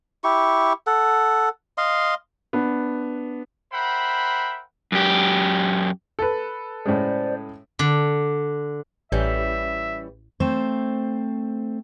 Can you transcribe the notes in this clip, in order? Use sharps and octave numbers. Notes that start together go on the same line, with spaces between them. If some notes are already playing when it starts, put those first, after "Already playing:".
E4 G4 C#6
A4 F#5
D#5 F5 C6
B3 D4
A#4 C5 E5 F#5 G5 B5
F#2 G4
A4 B4
A2 C#3 G#3 C5 D5
D3
A1 E3 G3 C#4 E5 G6
A3 C4 C5